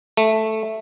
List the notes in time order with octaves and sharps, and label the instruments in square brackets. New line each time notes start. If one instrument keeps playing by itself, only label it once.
[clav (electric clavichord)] A3